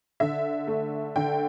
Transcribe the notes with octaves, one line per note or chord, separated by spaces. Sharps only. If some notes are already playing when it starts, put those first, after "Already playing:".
D3 E5
A3
D3 G5